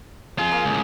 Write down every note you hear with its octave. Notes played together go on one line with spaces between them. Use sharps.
F2 F4 G#4
A#3
C#2 A2